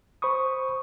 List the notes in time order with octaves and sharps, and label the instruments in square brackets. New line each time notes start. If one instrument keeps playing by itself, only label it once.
[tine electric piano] C5 B5 C#6 D#6